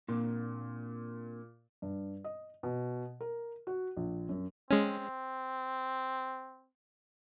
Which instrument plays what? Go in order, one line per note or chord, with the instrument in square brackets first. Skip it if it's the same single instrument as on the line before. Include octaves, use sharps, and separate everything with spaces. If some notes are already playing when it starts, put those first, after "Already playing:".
[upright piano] A#2 [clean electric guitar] A#3 C4 D4
[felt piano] G2
D#5
B2
A#4
F#4
A#1
F#2
[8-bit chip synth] G#3 C#4 [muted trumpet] C4